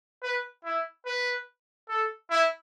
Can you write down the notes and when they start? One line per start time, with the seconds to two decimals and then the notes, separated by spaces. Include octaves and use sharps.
0.23 B4
0.65 E4
1.06 B4
1.89 A4
2.30 E4